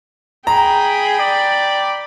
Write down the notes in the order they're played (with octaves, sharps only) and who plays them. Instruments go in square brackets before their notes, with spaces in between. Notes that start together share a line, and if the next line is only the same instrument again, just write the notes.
[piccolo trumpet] G#4 [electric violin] G5 B5 [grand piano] A#5
[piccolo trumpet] D5